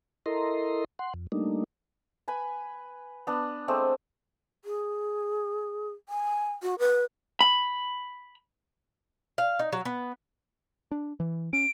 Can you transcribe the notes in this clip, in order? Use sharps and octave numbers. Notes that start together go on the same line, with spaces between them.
E4 A4 A#4 D#5 A#5 C6
F#5 C6
F2
G3 A3 A#3 D4 D#4
B4 G#5 B5
B3 D4
G#3 A3 C4 D4
G#4
G#5
F#4
B4
B5
F5
D#4
F#3
B3
D4
E3
C#4 D7